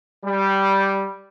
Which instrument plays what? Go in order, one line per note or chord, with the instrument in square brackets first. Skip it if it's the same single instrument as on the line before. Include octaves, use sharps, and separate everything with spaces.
[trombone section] G3